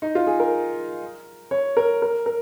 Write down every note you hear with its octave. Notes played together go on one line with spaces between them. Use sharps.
D#4
F4
G#4
A#4
C#5
A#4
A#4
A#4